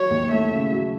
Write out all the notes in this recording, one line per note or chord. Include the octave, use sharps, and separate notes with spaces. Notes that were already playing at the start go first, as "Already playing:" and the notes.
Already playing: F#3 C#5
D#2
A3 E5
C#3
F#3